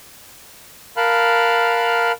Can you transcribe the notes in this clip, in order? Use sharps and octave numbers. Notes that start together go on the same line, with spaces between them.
A#4 F5 A5 B5 F6 F#6